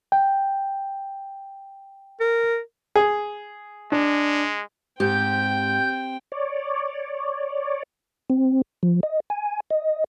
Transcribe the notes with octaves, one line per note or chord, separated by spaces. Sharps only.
G5
A#4
G#4
G#3 D4
G#2 C4 G4 G5 G6
C#5 D5
C4
F3
D#5
G#5
D#5